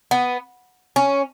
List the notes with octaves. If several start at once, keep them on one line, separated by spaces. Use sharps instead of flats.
B3
C#4